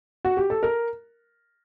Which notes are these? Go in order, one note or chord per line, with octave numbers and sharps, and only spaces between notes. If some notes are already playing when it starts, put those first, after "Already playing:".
F#4
G4
A4
A#4